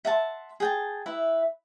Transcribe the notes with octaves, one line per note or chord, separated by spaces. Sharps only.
E5 F#5 A5 C6
G#4 G5 A5
E4 B4 E5